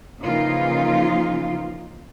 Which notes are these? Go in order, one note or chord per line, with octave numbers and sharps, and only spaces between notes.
C#3 E3 F3 A#3 D#4 F4